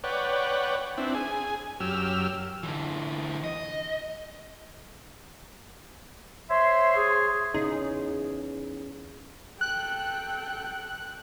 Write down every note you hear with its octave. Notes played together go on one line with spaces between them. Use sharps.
B4 C#5 D5 F#5 G5
C4 D4 E4
G#4 G#5
F#2 G4 E6 F6
D3 E3
D#5
C5 C#5 E5 C6
G#4
E2 C#3 D#4 G#4
A4 G5 F#6